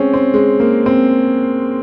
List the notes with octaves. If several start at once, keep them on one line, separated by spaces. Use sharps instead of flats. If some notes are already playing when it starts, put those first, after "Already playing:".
Already playing: G#3 C4 C#4
C4
G#3
A#3
C4